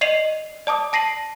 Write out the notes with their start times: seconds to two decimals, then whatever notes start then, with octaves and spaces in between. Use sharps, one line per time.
0.01 D5 D#5 C7 D#7 F7 F#7
0.67 D5 A5 D6 D#6
0.93 A5 A#6 C7 D#7 F#7